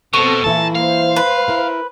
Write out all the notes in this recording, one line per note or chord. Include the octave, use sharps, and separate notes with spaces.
B2 C4 A4 C#6
A#2 E3 A#3 E4 A5
C5 F5
B4
E4 A#4